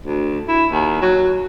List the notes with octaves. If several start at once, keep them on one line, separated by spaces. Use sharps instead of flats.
D2
E4
D#2
F#3